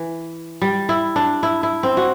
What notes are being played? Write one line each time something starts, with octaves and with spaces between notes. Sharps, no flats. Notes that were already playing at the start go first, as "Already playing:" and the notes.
Already playing: E3
G3
E4
D4
E4
E4
C4
F#4